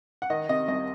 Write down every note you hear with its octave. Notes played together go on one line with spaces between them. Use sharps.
F#5
D#3 D#5
C3 D#5
C2 D#5